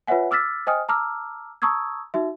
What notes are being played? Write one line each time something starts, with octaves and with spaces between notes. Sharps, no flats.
F4 B4 C#5 E5 F#5 G#5
D6 E6 F6 A6 B6
C5 D#5 G5 G#5 D#6 F6
A5 A#5 D6 E6 F6
A5 A#5 C#6 D#6 E6 G#6
D#4 F#4 E5